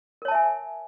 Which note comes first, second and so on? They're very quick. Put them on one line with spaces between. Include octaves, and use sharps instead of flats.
A#4 C#5 A5 E5 G#5